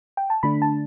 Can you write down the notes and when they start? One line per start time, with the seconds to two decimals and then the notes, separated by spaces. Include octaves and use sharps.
0.17 G5
0.30 A5
0.43 D3 A3 D4 B5
0.62 A5